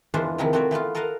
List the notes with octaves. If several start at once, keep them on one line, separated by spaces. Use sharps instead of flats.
E2 E3 G#3 D4 F4 C5
C3 D#3 F3 C4 E4
A3 C4 F#4 C#5 D5 E5
E3 A3 B3 F4
A4 A#4 D#5 F5 F#5